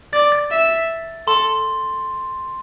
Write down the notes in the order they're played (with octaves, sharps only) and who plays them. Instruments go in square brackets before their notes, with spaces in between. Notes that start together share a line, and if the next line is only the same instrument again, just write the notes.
[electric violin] D5 [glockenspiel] A6
[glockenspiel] A6
[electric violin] E5
[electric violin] A4 [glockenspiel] C6